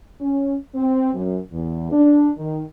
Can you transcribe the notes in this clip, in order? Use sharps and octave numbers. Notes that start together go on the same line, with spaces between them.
C#4
C4
F#2
E2
D4
D#3